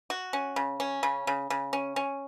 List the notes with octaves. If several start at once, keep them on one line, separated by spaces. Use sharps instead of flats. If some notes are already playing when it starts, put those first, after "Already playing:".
F#4
C#4
C#3
C#4
C#3
C#3
C#3
C#4
C#4